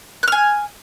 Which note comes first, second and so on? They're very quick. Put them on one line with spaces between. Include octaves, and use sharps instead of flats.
F#6 F6 G#5